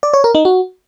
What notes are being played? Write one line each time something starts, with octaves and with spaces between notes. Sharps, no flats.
D5
C#5
A#4
D#4
F#4